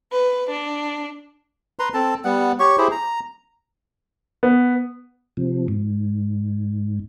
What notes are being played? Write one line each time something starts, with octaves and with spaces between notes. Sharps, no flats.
B4
D4
B4 A#5 C6
C4 A4 A5
G3 B3 F#5
G4 C#5 C#6
E4 G4 G#4 C5
A#5
B3
C3 F3
G#2